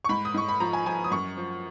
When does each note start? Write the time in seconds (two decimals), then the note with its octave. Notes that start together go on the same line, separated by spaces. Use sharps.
0.04 C#6
0.09 G#2 B5
0.25 D#6
0.34 G#2 C#6
0.49 B5
0.60 F3 A#5
0.73 G#5
0.86 F3 G#5
1.04 D#6
1.11 F#2 C#6
1.37 F3